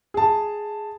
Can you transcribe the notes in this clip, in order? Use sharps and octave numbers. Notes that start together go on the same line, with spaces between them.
G#4 A5